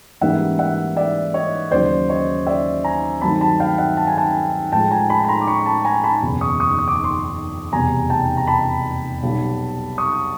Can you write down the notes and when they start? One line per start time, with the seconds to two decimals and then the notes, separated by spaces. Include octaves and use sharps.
0.21 G#2 E3 G3 A#3 C#4 E5 F#5
0.59 E5 F#5
0.97 D5 E5
1.34 C#5 D#5
1.71 D#2 C#3 F#3 C5 D5
2.09 C#5 D#5
2.47 D5 E5
2.84 G#5 A#5
3.21 G2 D#3 F#3 A3 C4 A5 B5
3.41 A5 B5
3.60 F5 G5
3.78 E5 F#5
3.97 A5
4.07 G#5
4.17 G5 A5
4.72 A2 F3 G#3 G5 A5
4.91 G#5 A#5
5.10 A5 B5
5.24 B5
5.28 A#5 C6
5.41 D6
5.47 B5 C#6
5.66 A5 B5
5.85 G#5 A#5
6.04 A5 B5
6.22 F#1 E2 B2
6.41 C#6 D#6
6.60 C#6 D#6
6.79 D#6
6.88 D6
6.96 C#6
7.04 C6 D6
7.73 F1 E2 B2 G3 G#5 A#5
8.10 G5 A5
8.37 A#5
8.47 A5 B5
9.23 B1 B2 G3
9.98 C#6 D#6